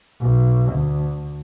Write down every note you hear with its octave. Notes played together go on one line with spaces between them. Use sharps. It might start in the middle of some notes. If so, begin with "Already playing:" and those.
B1
D2